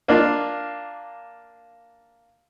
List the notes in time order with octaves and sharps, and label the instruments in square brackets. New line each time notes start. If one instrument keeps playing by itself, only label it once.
[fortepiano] A#3 D4 F4